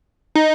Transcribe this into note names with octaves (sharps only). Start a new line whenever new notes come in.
D#4